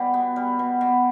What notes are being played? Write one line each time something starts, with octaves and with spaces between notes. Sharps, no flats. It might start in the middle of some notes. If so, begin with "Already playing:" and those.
Already playing: B2 G3 D5
B3
G3
B2
B2